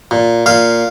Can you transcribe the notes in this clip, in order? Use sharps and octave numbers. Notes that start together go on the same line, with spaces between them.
A#2
A#2 F5